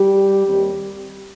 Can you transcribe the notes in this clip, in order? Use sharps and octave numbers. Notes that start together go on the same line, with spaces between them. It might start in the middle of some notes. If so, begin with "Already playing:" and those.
Already playing: G3 G4
D#2 D#3 G3 C4